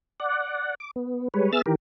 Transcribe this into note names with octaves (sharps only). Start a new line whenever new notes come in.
D5 F#5
D6
B3
G3 G#3 B4 C#5
B3 G#4 E5 E6 F6 A6
D#3 E3 G4 A#4